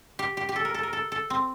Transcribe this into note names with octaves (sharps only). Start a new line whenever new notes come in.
G4
G4
G4
A4
A#4
A4
A#4
A4
A4
C4